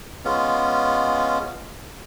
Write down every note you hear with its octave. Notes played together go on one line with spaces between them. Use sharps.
G#3 B3 C#4 F4